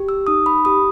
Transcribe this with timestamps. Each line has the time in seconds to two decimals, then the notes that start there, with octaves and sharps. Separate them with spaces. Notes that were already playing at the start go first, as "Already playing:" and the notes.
Already playing: G4
0.09 E6
0.27 D#4 D#6
0.46 B5
0.65 G4 D#6